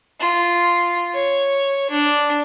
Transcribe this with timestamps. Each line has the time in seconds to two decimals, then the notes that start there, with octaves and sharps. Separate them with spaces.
0.20 F4
1.14 C#5
1.90 D4